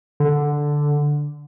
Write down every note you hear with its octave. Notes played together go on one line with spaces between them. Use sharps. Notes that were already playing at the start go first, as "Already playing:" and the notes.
D3